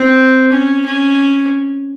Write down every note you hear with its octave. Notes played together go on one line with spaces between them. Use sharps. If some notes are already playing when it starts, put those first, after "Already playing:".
Already playing: C4
C#4
C#4